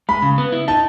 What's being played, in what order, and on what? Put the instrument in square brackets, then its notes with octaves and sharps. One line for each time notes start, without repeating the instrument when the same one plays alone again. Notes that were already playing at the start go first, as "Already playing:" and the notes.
[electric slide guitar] G#3 [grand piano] B5
[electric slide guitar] C#3
B3
E4
[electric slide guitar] D#4 [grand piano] A5